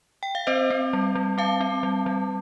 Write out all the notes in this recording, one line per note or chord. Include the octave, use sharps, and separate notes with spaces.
G5
F5
C4 C5 D#5
C4
G3
G3
C4 F5 A5
C4
G3
G3